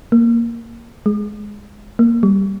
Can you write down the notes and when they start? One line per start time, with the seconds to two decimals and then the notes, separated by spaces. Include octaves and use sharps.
0.12 A#3
1.06 G#3
1.99 A#3
2.23 G3